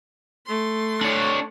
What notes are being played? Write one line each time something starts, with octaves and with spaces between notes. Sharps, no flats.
A3 C6
D4 C#5